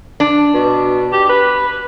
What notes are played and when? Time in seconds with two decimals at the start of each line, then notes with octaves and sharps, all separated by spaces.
0.20 D4
0.54 B2
1.12 G4
1.29 B4